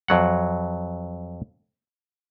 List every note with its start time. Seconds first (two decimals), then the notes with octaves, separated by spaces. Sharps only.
0.08 F2 F#3 F#5